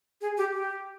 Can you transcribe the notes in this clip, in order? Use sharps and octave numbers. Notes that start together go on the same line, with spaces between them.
G#4
G4
G4